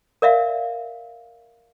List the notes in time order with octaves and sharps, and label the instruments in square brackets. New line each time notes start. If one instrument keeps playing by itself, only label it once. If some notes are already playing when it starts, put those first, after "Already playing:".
[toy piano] A#4 D5 E5 F5